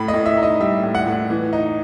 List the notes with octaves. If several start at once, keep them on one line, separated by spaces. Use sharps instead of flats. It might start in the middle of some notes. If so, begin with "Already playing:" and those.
Already playing: A2 B5
D#5
A2
E5
D#4
D#5
G3 E5
A2
F#5
A2
E3
D#4